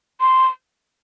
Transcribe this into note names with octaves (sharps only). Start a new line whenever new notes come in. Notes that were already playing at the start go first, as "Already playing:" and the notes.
C6